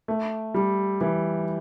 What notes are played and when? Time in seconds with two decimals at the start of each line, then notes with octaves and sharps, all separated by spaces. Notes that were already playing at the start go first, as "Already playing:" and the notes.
0.08 A3
0.54 G3
1.01 E3